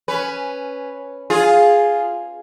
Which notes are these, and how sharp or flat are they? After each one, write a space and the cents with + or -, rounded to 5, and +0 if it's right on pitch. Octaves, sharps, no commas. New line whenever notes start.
C#4 +0 B4 +0
F4 +0 G#4 +0